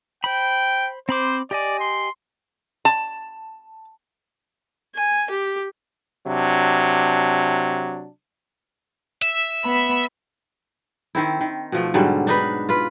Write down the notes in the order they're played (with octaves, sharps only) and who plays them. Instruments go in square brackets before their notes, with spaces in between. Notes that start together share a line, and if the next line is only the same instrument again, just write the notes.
[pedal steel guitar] C5 B5 [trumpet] G5
[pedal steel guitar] C4 B5 D6 [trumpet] C5
[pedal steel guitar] G4 D#5 G#5 [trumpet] D5
[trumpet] C6
[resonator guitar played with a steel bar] A5
[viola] G#5
G4
[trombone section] C3 F#3 D4
[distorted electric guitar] E5
[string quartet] B3 B5
[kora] D#3 C4 E4
D#3
B2 F3 A3
G#2 D3 F#3 G3
D4 D#4 B4
F4 B4